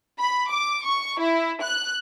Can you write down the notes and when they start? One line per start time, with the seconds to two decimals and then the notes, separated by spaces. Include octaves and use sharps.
0.19 B5
0.50 D6
0.86 C#6
1.21 E4
1.61 F#6